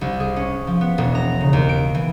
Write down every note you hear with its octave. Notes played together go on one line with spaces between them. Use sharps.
C2
G#4
C#4
F3
B3
E1
A#5
C#3
D#2
D7
E3